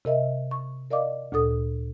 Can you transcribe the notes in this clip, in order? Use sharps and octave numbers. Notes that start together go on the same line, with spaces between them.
C3 A#4 D#5 E5
C#6
A#4 D5 D#5 F5 D6
D2 A#2 A4 D#6